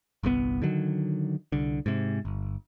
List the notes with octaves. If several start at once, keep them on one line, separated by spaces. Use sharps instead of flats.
G1 C2 A#2 B3
D3 D#3 F#3
C2 D3
G#2 C3
G1